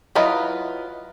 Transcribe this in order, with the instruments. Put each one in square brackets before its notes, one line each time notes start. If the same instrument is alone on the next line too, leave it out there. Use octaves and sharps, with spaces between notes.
[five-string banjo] F#3 E4 F4 B4 D#5